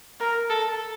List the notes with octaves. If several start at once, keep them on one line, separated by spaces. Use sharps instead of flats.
A#4
A4